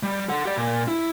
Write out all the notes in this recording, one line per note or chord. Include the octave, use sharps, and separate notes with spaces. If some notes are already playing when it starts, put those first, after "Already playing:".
G3
A4 F#5
G4 D5
A#2
E4